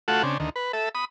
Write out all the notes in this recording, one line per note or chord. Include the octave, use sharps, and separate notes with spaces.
A3 F4 F#4 A4 F#5
C#3 C4 D4
D2 D#3
B4
A4 E5
B5 D#6